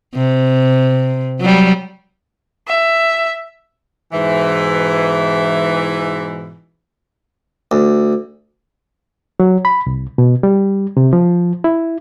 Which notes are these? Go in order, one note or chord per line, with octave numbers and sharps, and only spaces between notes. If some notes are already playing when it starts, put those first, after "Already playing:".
C3
F#3 G3
E5
G#2 B2 E3
D2
F#3
B5
C2
B2
G3
C3
F3
E4